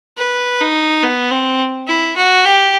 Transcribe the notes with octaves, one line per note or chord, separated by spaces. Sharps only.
B4
D#4
B3
C4
E4
F#4
G4